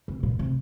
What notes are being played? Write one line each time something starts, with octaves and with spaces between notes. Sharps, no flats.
C3
A#2
C3